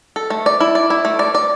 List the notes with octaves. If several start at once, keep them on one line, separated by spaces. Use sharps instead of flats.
A4
A3
D5
E4
D5
E4
A3
D5
D5